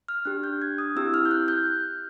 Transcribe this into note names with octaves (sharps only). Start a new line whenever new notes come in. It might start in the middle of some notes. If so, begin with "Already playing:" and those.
F6
D4 G4 F#6
G6
G#6
D#6
C4 E4 G4 E6
F6
G6
F#6
G6